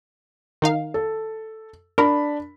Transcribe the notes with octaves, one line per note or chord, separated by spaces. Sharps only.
D#3 D#4 F5
A4
D4 A#4 B5